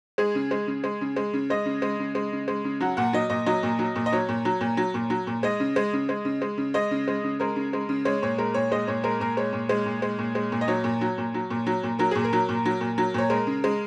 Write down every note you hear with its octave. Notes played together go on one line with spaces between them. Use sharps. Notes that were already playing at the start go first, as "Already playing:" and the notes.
G#3 G#4
C#3
G#3
C#3
G#3
C#3
G#3
C#3
G#3 D#5
C#3
G#3
C#3
G#3
C#3
G#3
C#3
F#3 F#5
A#2 F#5
F#3 D#5
A#2 D#5
F#3 D#5
A#2
F#3
A#2
D#5
F#3 C#5
A#2
F#3
A#2
F#3
A#2
F#3
A#2
G#3 D#5
C#3
G#3
C#3
G#3
C#3
G#3
C#3
G#3 D#5
C#3
G#3
C#3
G#3 A#4
C#3
G#3
C#3
G#3 C#5
A#2 C#5
G#3 A#4
A#2 C#5
G#3 D#5
A#2 C#5
G#3 A#4
A#2 A#4
G#3 C#5
A#2
G#3
A#2
G#3
A#2
G#3
A#2
D#5
F#3 C#5
A#2
F#3
A#2
F#3
A#2
F#3
A#2
F#3 A#4
A#2 G#4
A#4
F#3
A#2
F#3
A#2
F#3
A#2 C#5
G#3 A#4
C#3
G#3